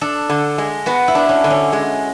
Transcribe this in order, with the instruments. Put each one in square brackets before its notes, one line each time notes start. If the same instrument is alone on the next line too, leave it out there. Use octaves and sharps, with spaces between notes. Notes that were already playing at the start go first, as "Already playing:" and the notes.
[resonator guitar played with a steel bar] D4 [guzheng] A4
[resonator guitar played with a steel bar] D3
G#3
[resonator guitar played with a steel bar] B3 [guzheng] F#4
[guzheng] E4
[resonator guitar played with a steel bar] D4
[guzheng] C#4
[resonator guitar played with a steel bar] D3
[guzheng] C#4
[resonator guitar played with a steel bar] G#3